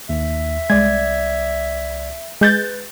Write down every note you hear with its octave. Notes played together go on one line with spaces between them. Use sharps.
D#2 E5
C2 G#3 D5 G#6
G#3 B4 G6 A6